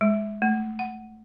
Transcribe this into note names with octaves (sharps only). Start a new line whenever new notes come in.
G#3
A3
F#5